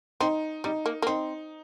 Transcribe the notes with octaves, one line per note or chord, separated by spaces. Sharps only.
C4 D#4
G3 D#4
A#3
A#3
C4 D#4